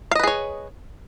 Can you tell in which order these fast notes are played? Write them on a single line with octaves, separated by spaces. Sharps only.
F5 D#5 B4 G#4 C#5